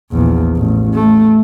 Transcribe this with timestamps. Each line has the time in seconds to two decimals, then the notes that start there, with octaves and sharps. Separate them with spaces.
0.12 A#1 E2
0.56 A1
0.94 A3